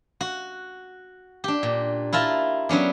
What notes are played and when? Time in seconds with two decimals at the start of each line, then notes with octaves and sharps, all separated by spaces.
0.21 F#4
1.44 D4 G4
1.63 A#2
2.13 E4 F4 A#4 A5
2.69 F#3 B3 C#4 D4